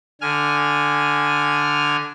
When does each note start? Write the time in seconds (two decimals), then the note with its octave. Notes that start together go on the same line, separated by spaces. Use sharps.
0.21 D3 G#5 F6